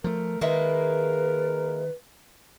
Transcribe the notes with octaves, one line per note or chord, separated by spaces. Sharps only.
F3 A3 A#4
D#3 G#3 A#3 E4 A#4 B4